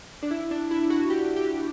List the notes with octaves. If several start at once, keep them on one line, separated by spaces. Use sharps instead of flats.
D4
E4
D4
E4
F#4
G4
G4